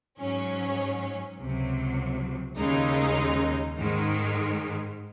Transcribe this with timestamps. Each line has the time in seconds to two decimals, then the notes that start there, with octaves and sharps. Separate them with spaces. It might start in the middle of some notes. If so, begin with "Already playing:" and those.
0.19 G#2 F#3 C#4
1.38 C#2 C3 F#3
2.57 D#2 C#3 G#3 D#4
3.77 G#2 D#3 G#3